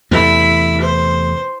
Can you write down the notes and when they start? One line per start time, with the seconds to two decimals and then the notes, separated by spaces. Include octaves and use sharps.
0.11 E2 C3 A3 E4 B5
0.80 C5